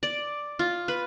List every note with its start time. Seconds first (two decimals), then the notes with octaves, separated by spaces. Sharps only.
0.03 D5
0.59 F4
0.88 B4